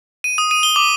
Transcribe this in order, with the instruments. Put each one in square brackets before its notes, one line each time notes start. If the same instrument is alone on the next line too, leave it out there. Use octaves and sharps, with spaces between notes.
[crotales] D#7
D#6
D#7
G7
D6